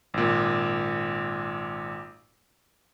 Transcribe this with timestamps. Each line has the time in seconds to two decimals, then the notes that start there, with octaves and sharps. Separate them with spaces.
0.14 G#1 A#2